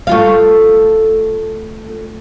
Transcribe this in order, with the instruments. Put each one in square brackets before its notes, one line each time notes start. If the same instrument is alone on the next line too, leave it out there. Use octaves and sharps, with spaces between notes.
[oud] A3 F4 F5